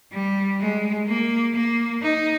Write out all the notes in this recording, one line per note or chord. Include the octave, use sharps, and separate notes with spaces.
G3
G#3
A#3
A#3
D#4